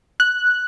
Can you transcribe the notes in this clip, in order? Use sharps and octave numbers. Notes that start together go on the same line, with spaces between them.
F#6